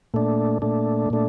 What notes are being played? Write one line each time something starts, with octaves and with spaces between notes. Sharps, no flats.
A#2 A3 D4
A#2 A3 D4
A#2 A3 D4